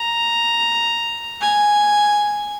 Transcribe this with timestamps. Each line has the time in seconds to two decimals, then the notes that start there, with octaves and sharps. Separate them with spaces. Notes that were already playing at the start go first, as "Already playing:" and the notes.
Already playing: A#5
1.41 G#5